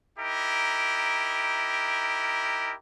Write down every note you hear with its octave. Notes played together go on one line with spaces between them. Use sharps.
D#4 E4 G4 A#4